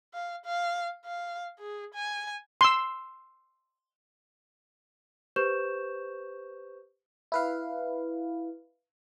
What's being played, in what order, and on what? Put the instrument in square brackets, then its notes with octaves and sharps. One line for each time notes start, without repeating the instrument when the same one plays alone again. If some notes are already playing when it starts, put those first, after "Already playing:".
[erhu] F5
F5
F5
G#4
G#5
[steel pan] C6 E6
[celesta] G4 B4 C5 C#6 G6 E7
[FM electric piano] E4 B4 F5